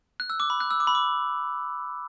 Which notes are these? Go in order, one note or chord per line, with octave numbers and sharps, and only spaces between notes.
F#6
E6
D6
B5
F#6
E6
D6
B5
D6